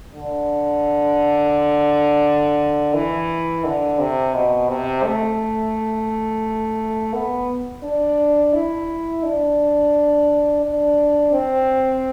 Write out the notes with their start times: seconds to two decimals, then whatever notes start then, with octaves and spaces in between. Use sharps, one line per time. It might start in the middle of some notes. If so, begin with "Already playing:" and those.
0.15 D3
2.93 E3
3.64 D3
3.99 C3
4.34 B2
4.68 C3
5.04 A3
7.13 B3
7.83 D4
8.53 E4
9.23 D4
10.62 D4
11.32 C4